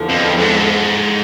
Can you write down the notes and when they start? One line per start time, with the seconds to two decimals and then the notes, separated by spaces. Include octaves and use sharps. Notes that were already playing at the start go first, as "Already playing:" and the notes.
Already playing: E2 D3 F3
0.09 F2
0.38 F2
0.41 G#2